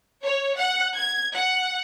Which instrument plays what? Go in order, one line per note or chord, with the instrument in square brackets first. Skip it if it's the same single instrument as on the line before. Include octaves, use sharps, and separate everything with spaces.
[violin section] C#5
F#5
G#6
F#5